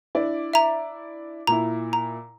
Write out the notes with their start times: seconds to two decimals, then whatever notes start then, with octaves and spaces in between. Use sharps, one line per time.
0.15 D4 E4 D5
0.53 E5 A#5
1.47 A#2 E4 A#5
1.93 A#5